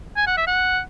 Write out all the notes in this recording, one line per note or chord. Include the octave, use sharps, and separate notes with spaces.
G#5
F#5
E5
F#5